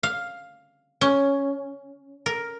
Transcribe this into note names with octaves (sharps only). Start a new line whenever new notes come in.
F5
C#4
A#4